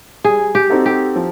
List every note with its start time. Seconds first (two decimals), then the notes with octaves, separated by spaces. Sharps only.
0.24 G3 G#4
0.55 G4
0.70 C4 D#4 F#4 A4
0.86 G4
1.16 F3